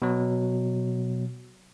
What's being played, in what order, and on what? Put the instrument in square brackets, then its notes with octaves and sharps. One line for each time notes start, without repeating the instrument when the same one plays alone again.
[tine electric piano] B2 F#3